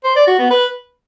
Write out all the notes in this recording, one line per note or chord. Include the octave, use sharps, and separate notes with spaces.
C5
D5
F#4
B3
B4